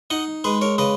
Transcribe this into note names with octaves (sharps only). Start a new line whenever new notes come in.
D#4 D#5 F#5
G#3 G#4 B4
A#4 C#5
C#3 B4 D#5